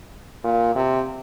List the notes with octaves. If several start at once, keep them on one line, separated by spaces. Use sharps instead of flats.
A#2
C3